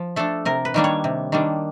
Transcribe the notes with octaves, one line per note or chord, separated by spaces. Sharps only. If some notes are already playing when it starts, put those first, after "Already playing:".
Already playing: F3
A3 D4 A4
C3 A#4
B4
D#3 G3 A#3 D4
C#5
C3
D#3 G3 A#3 D4